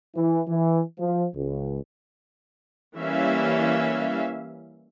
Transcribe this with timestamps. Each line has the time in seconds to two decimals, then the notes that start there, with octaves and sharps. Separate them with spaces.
0.15 E3
0.48 E3
0.99 F3
1.34 C#2
2.97 E3 G3 A#3 C#4 E5 F5